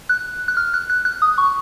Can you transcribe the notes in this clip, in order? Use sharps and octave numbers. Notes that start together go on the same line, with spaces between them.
F#6
F#6
F6
F#6
F#6
F#6
D#6
C#6